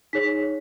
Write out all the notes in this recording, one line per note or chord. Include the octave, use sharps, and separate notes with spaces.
D#4 G#4 C#5 B6